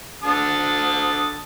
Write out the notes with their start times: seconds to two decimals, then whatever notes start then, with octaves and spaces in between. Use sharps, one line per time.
0.23 D3 A5 D#6